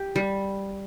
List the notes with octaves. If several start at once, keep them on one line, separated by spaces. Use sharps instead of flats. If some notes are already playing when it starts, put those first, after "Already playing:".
Already playing: G4
G3